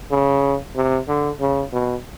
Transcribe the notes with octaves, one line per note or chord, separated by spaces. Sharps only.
C#3
C3
D3
C#3
B2